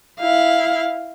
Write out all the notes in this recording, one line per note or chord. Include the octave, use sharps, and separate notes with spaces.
E4 F5